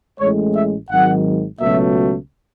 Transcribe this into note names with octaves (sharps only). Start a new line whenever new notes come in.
A1 A2 G#3 C#5
E5
G#1 G#2 D#3 F#3 F#5
C#2 B2 F#3 A3 E5